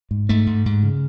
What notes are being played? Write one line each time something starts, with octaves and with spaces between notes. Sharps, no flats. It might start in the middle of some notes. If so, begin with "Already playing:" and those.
G#2
G#2 A3
G#2
G#2
C#3